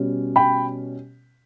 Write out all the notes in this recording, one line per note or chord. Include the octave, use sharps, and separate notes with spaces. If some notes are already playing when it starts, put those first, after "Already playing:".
Already playing: B2 G3 C#4
G5 B5